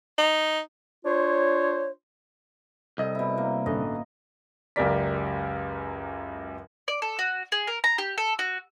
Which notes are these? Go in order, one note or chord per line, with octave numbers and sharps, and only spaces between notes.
D#4
D4 F4 C5 C#5
C2 A4 D#5
B2 E4
A#3
A1 G2 D3 D#5
C#2 F#2 G4 A#4 D5 B6
D5
A4
F#4
G#4
A#4
A#5
G4
A4
F#4